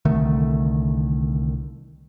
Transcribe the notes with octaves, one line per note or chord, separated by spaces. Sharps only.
C2 D3 D#3 A3